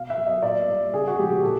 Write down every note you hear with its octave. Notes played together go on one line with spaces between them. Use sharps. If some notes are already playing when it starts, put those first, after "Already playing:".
Already playing: B2 F5
E5
F#3
D#5
A#2 D5
G3
C#3 G#4
F#4
F3 G#3 G4
A#2 A4